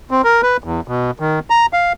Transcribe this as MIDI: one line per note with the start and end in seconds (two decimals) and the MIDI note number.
0.11 0.22 60
0.24 0.41 70
0.42 0.57 71
0.64 0.80 40
0.88 1.11 47
1.20 1.39 51
1.50 1.66 82
1.73 1.93 77